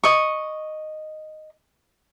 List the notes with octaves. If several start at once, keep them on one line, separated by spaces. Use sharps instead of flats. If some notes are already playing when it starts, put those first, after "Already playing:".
D#5 C#6